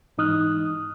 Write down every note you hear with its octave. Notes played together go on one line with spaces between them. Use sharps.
G#2 E3 D#4 D#6 F6 F#6